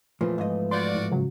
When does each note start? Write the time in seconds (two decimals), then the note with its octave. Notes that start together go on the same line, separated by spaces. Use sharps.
0.21 E2 A#2 E3 F3 A3
0.38 G#2 F3 D#5
0.71 F4 F#4 D5 C6 G6 A6
0.95 A2
1.12 C#3 F#3